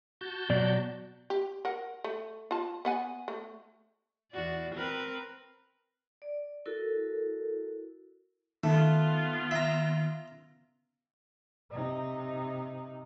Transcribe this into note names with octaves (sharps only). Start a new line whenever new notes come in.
F#4 A5 G6
B2 F#3 D5
G4
A#4 F#5
A3
F4 A5
B3 F#5 G#5
A3
E2 F#4 D5
C4 A#4 B4
D5
E4 F#4 A4 A#4
D#3 A3 B3 F4
E5 A#5
C3 D#4